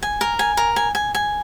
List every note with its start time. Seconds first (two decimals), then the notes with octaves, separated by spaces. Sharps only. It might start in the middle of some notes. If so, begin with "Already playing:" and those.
0.03 G#5
0.21 A#4
0.39 G#5
0.57 A#4
0.76 G#5
0.95 G#5
1.15 G#5